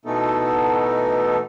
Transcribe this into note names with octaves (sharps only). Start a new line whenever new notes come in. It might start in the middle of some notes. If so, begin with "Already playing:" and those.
B2 E3 A3 B3 D#4 A4